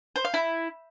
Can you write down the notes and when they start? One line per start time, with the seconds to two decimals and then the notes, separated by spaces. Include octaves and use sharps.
0.16 C5
0.25 F5
0.34 E4